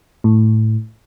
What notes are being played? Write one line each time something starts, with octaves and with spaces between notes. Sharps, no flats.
A2